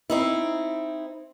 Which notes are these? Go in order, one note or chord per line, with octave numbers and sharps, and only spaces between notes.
C4 D#4 E4